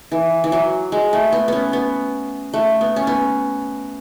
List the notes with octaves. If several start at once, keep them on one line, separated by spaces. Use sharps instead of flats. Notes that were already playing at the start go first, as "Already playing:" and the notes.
E3
E3
F#3
G#3
A3
B3
B3 C#4
B3
A3
B3
C#4
B3